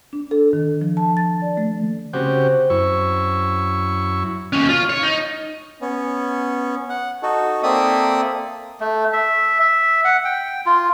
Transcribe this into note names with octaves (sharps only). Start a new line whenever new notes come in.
D4
A4
D#3
F3
A5
A6
D5
A3
C#3 C4 F#4 G4
F#2 E4 C#6
D#2 C#4
F4
C#5
D#4
B3 C#4
F#5
D#4 F#4 A4
A#3 C4 A4 D5 E5 D#6
A3
E5
E5
F#5
G5
F4